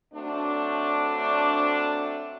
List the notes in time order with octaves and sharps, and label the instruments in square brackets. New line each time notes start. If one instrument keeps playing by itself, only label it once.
[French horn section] F#3 A3 C4 D4